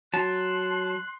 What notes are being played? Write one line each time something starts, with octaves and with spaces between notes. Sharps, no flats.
F#3 A5 C6 F#6